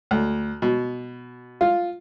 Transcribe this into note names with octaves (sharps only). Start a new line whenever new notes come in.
D2
B2
F4